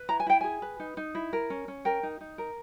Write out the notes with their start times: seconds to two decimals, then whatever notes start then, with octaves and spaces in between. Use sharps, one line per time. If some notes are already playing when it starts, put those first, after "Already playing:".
Already playing: B4
0.09 E4 A#5
0.20 G#5
0.26 E4 G5
0.41 G#4 G#5
0.62 B4
0.80 D#4
0.97 D#4
1.15 E4
1.33 A#4
1.50 C#4
1.68 C#4
1.85 A#4 G5
2.03 D#4
2.21 D#4
2.38 A#4